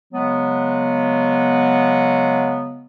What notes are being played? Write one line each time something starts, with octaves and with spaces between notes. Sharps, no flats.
C#3 F#3 G#3 B3